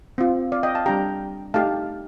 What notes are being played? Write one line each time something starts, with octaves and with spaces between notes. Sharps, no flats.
C4 F4
D5 F5
D#5 G5
F5 A5
G3 D4 G4 G5 A#5
A3 D#4 G4 F5 A5